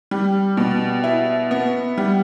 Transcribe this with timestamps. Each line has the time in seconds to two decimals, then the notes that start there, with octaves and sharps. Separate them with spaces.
0.11 G3
0.57 B2
1.04 E4
1.51 B3
1.98 G3